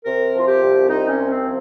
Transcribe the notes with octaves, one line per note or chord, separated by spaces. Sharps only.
C3 A#4
F3
F4
G4
C2
C2 D#4
C#4
C3
C4
F3